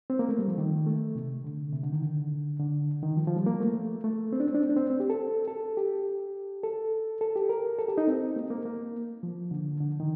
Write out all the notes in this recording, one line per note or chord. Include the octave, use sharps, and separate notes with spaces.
C4
A#3
A3
G3
F3
D#3
A3
C3
D3
C3
D3
D#3
D3
D3
D#3
F3
F3
G3
A#3
A3
A3
C4
D4
C4
D4
C4
D4
C4
C4
G4
A4
A4
G4
A4
A4
G4
A#4
A4
G4
D#4
C4
A#3
A#3
A#3
F3
D3
D3
D#3